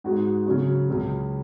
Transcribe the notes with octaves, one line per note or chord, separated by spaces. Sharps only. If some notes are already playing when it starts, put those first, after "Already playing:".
G#2 G#3 F#4
C#3 F#3 C#4 F#4
C#2 C#3 F#3